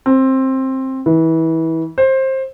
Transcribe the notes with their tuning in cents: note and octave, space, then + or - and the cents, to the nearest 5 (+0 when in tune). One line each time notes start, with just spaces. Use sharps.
C4 +15
E3 -25
C5 +20